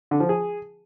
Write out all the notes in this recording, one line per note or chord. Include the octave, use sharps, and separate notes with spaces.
D3
F3
G#4